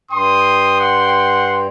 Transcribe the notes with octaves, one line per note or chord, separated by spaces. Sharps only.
G2 G5 C6 D#6
F#5